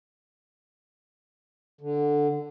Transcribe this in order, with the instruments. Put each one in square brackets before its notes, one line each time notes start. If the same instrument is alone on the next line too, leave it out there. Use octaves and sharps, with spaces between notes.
[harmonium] D3